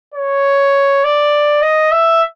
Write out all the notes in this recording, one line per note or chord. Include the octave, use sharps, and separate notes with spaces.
C#5
D5
D#5
E5